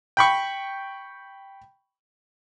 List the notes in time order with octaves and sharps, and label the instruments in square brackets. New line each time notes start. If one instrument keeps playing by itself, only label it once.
[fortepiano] G5 B5 C#6